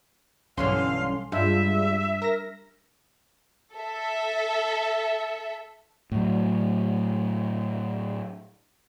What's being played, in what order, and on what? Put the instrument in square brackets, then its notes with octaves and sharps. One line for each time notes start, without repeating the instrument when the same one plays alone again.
[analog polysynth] B1 C#4 C6 [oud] G2 D3 E3 [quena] F5
[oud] G2 [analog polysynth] G#3 D4 F4 [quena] E5
[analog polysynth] A#4 A#6
[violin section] A4 E5
[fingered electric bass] A2 F#3